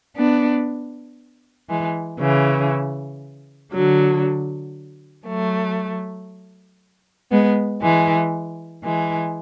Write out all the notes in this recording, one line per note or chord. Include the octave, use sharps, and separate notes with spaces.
B3 D4
E3 G#3
C#3 E3
D3 F#3
F#3 A3
G#3 B3
E3 G#3
E3 G#3